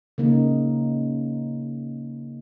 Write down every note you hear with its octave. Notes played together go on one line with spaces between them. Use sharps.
C#3 A#3 D#4